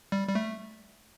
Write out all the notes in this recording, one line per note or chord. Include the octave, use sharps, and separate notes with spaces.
G3
G3
A3